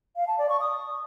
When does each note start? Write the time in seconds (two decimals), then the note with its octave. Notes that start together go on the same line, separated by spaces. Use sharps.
0.16 F5
0.27 A5
0.38 D5
0.49 C#6
0.60 D#6